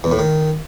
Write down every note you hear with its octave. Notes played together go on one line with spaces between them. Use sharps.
E2
A2
D#3